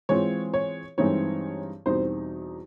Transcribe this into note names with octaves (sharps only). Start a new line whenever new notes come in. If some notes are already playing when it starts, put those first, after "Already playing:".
E3 G#3 C4 F4 C#5
C#5
G2 E3 G#3 C4 D#4 C#5
E2 B2 G3 C4 D#4 C5